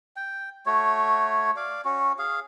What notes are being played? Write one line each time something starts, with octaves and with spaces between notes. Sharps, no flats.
G5
A3 F#4 C#5
D5 F5
C#4 F#4
G#4 F5